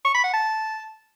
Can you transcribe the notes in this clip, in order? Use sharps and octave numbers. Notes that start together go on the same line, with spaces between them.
C#6
B5
F#5
A5